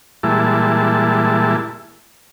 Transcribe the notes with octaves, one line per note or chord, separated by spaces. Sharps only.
A#2 E3 G3 G#3 E4 A5